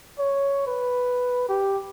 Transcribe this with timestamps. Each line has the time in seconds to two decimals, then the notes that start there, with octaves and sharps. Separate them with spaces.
0.19 C#5
0.66 B4
1.49 G4